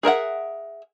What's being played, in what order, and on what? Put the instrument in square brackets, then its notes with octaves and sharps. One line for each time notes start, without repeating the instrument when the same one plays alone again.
[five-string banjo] G#4 A#4 E5 F#5